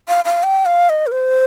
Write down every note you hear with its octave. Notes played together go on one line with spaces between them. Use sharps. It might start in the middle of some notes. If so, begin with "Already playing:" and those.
F5
F5
G5
F5
D#5
A#4
C5